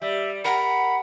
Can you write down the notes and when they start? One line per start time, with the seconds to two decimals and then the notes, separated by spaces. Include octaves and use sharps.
0.02 G3 E5
0.45 A#4 F#5 B5